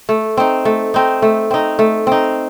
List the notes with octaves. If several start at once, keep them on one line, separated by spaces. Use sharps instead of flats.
A3
C4 D#4
A3
C4 D#4
A3
C4 D#4
A3
C4 D#4